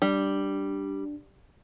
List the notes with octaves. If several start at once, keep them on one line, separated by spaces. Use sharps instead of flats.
G3 D4